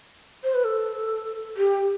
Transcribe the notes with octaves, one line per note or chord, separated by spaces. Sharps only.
C5
B4
A4
G4